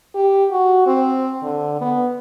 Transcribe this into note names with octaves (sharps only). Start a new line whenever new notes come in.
G4
F#4
C4
D3
B3